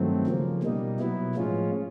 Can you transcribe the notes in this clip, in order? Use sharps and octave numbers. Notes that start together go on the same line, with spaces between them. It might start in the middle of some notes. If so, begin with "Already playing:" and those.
Already playing: G2 D#3 F#3 A3 C4
C#3 F3 A#3
B2 G3 A#3 D#4
B2 F#3 B3 E4
A2 F3 G#3 C#4 F4